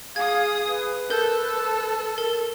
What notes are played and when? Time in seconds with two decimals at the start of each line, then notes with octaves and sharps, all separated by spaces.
0.16 G#4 F5 D#6 G#6
0.67 B4
1.10 A4 A#4 G6
2.18 A#4